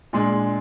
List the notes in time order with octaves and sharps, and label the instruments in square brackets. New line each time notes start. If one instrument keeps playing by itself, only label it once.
[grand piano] A#2 G#3 D4 C6